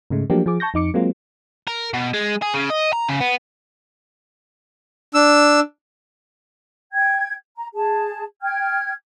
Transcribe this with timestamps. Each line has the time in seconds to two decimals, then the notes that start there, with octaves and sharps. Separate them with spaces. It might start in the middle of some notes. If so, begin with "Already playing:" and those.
0.10 G#2 C#3 G#3 A3
0.30 F3 F#3 A3 A#3 D4 G4
0.46 F3 G#4 D6
0.60 A5 C#6 G6 A#6
0.74 F2 D#4 D6 C#7
0.94 F#3 G#3 A#3 C4 F4
1.67 A#4
1.94 B2
2.14 G#3
2.42 G#4
2.54 C#3
2.70 D#5
2.93 A#5
3.08 C#3
3.21 B3
5.14 D4 E6
6.92 G5 G#6
7.56 A#5
7.74 G#4 A5
8.42 G5 F6 G#6